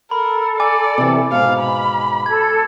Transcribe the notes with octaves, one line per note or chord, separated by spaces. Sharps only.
A4 A#4 B5
D5 G#5 D6
C3 E3
G#2 B2 F5
B5
A4 G#6